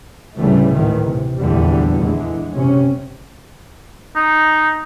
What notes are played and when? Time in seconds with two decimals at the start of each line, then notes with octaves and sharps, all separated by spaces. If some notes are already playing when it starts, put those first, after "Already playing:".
0.36 D2 A2 C#3 E3 G3 A3
0.72 G#1 D2 A2 D#3 E3
1.06 C3
1.39 F1 A#1 E2 D3 E3 G3
1.99 D3 E3 G#3
2.54 F#1 C3 C#4
4.15 D#4